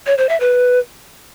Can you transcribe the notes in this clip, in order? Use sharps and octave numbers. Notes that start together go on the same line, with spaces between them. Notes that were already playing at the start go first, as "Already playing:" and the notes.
C#5
C5
E5
B4